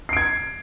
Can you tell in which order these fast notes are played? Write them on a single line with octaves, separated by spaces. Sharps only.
C7 D7 G#6